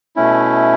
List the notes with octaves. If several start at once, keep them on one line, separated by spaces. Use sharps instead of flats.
B2 A3 C#4 E4